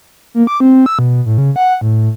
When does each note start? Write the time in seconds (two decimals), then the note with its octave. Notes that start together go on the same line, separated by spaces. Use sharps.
0.34 A#3
0.47 D6
0.60 C4
0.86 E6
0.99 B2
1.26 A2
1.38 C#3
1.56 F#5
1.81 A2